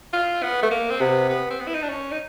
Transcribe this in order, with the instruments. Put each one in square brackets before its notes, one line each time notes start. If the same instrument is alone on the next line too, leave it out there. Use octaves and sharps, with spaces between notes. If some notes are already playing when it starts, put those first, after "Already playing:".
[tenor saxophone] F4
B3
A3
A#3
C4
[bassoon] C3 [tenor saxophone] B3
[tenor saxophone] B3
C4
B3
E4
D#4
D4
C#4
D#4